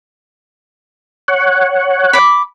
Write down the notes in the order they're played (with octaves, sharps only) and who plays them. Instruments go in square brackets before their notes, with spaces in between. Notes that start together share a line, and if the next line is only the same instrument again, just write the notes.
[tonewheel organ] C#5 F#5
[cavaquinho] B5 D6